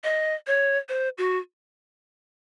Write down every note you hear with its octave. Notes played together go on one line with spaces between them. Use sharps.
D#5
C#5
C5
F#4